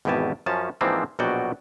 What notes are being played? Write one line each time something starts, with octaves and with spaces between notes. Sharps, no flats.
G#1 E2 B2 G4 G#5 A5
F#2 F3 C#4 A5
G#2 E3 F3 A#3 C4 D4
A#1 B2 F#3 F#4 D5 G5